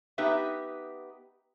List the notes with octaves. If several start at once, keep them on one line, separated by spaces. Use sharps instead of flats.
B3 D#4 G4 B4 E5